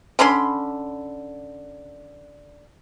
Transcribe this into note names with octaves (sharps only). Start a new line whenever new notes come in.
D3 C#4 B5 C6